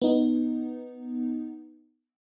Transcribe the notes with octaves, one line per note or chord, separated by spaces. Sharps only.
B3 D#4